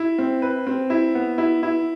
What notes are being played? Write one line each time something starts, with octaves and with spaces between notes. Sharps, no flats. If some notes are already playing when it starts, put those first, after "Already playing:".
Already playing: E4
C4
B4
C4
E4
B3
E4
E4